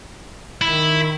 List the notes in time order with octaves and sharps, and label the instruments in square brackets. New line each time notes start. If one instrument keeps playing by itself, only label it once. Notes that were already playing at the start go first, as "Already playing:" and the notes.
[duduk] D#3 [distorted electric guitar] E4